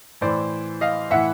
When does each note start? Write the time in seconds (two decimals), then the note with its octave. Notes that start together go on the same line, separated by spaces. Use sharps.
0.21 A2 E3 C5 D5
0.81 D#5 F5
1.10 A2 E3 E5 F#5